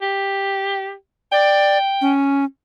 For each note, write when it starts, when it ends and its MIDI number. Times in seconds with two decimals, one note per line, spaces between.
0.02 0.93 67
1.32 1.78 74
1.32 2.11 79
2.01 2.45 61